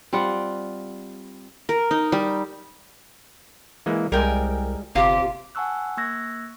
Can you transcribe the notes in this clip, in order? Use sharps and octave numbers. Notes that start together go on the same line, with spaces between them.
G3 C4 F4 F#5
A#4
D#4
G3
E3 G#3 A#3
C2 G3 G#3 A#4 G5 G#5
G1 C3 F4 G4
F#5 G#5 A5 C#6 E6 F#6
A#3 C#6 E6 F#6 G#6 A#6